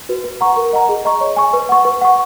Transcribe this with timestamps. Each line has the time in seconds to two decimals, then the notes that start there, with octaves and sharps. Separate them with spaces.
0.09 F#4 B4
0.24 B4
0.41 F#5 A#5 C#6
0.57 A#4
0.73 D#5 F#5 A#5
0.89 G#4
1.05 D#5 A#5 C#6
1.21 C#5
1.37 G#5 C#6
1.53 B4
1.69 F#5 C#6
1.85 B4
2.01 F#5 C#6